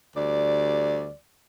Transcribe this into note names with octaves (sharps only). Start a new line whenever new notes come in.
D2 G3 D5